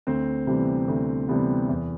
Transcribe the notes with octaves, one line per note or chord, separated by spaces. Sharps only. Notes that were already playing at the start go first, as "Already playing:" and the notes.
D2 C4 C5
C3 E3 G3 B3
D2
C3 E3 G3 B3
E2